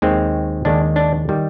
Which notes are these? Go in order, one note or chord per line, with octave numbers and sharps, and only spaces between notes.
D#2 D#3 G#3 C4
D#2 D#3 G#3 D4
D4
D#3 G3